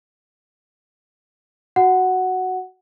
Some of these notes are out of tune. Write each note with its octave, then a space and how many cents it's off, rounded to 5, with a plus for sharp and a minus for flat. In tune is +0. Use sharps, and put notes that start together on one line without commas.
F#4 +0 F#5 +0